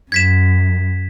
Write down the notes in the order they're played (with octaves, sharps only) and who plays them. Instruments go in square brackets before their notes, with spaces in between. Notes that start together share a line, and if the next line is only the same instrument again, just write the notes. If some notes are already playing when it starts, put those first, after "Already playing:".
[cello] F#2 [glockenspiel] G#6 B6 E7